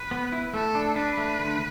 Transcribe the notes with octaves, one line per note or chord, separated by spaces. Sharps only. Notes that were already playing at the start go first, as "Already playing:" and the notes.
Already playing: B4
B3
E4
A3 A4
D4
D4 B4
A3
D3